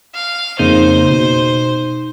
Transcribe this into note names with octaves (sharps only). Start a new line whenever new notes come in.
F5
F2 C#3 A#3 D#4 C5
B2